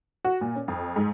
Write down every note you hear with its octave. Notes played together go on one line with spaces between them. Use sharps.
F#4
A#2
C#4
F2
G#2